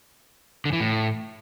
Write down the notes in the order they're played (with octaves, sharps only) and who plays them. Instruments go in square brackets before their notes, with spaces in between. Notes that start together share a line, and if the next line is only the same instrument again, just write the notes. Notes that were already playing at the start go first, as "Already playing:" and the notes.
[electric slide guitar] D3
E3
A2